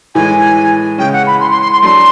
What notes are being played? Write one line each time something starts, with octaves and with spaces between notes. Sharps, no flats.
A2 E3 G#3 G#5
C#3 E3 G#3 C#4 G5
F#5
B5
C6
C6
C6
C6
F#3 A3 D4 C6